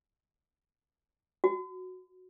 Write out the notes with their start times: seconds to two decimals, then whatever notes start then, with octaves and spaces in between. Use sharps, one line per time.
1.44 F#4